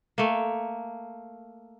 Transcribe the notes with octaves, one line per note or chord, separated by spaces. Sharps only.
A3 A#3